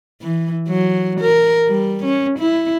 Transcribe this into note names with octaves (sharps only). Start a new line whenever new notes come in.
E3
F#3
A#4
G3
C#4
E4